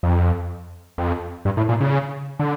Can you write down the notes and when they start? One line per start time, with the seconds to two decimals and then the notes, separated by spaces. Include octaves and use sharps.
0.03 F2
0.98 F2
1.45 G2
1.57 A2
1.69 A#2
1.81 C#3
2.39 D3